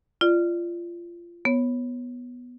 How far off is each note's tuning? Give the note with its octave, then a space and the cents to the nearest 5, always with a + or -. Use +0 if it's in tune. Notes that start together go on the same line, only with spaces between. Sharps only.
F4 -20 D5 +20
B3 +0 C#5 -15